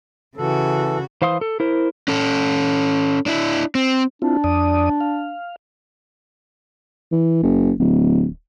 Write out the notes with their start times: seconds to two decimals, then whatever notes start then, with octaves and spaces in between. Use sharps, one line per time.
0.37 C#3 E3 F#4 A4
1.22 E3 C5 F5 C6 D#6
1.41 A4
1.60 E4 A#4 C5
2.08 C#4 A4
3.26 D4 E4
3.75 C4
4.22 C4 D4 E4 F4
4.44 F2 D5 D#6
5.01 F5
7.12 E3
7.43 F#1
7.80 D1